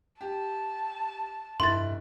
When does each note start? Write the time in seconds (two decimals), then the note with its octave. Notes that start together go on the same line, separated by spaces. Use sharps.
0.21 G4 A5
1.60 F1 G2 E4 C6 A6